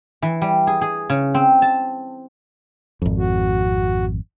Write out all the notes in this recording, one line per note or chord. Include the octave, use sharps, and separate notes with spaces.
E3
G3
G#4
G#4
C#3
C4
A5
G#1 F2
F#4